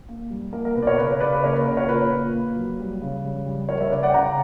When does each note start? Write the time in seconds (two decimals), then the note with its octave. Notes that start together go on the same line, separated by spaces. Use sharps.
0.09 A#3
0.30 G3
0.53 A#3 A#4
0.65 A#4
0.75 B2 B4
0.82 D5
0.87 A#4 C#5
0.98 C#3 B4
1.10 B4
1.20 C#3 B4 D5
1.32 B4
1.44 A#3 A#4 C#5
1.55 B4
1.66 C#3 A#4
1.77 A#4 C#5
1.89 A#2 B4
2.11 A#2
2.34 A#3
2.56 F#3
2.79 G3
3.02 C#3
3.24 G3
3.46 G3
3.69 G3 A#4 C#5
3.81 C#5 E5
3.91 C#3 B4 D5
4.03 D5 F#5
4.10 G5
4.14 C#3 F#5 A#5